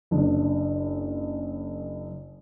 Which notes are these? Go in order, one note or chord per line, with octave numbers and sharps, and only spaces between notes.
F#1 D4